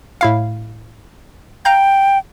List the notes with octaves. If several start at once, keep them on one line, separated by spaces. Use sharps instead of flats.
A2 E4 F5
F5 G5 A#5 G6